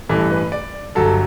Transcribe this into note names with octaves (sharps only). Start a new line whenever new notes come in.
A1 G2 E3 A4
B4
D5
G1 G2 F#3 A4